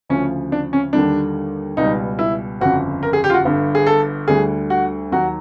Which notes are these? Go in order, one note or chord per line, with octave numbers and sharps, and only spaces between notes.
D2 C#3 F3 C#4
D4
C#4
D#2 D3 G3 D4
C#2 B2 G3 D#4
E4
G1 F2 C#3 F#4
A#4
G#4
G4
F4
F#4
G1 G2 D3
G#4
A4
D2 D3 G3 G#4
F#4
D#2 D#3 F#3 F#4